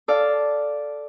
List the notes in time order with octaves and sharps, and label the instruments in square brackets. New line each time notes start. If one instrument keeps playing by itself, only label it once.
[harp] A4 D5 F5